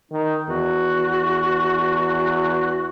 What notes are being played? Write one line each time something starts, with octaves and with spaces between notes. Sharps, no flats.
D#3 D#4
E2 F#4